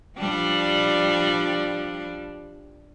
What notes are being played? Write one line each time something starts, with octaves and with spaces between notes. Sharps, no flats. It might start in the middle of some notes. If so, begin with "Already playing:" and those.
F3 G3 D4